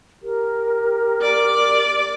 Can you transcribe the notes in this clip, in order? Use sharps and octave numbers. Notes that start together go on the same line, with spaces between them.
G4 A#4
D5